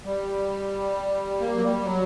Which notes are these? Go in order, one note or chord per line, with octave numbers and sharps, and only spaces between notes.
G3
A#3
F#3
G3
F#3